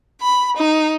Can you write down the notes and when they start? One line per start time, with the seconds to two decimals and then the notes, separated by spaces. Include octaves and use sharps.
0.21 B5
0.56 D#4